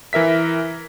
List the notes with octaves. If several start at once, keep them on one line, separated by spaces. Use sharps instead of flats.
E3 A#4 E5 B6